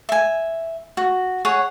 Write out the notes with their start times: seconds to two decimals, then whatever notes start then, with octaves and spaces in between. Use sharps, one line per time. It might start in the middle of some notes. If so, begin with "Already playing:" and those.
0.09 E5 G#5
0.97 F#4
1.45 G#4 C#5 F#5